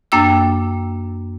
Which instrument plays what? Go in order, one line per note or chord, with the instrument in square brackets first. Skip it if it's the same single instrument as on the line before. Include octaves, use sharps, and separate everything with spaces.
[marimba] F#2 A#3 D4 G5 E6